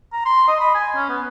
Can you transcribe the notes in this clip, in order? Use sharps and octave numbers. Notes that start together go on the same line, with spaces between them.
A#5
C6
D#5
B5
G#5
C#4
B3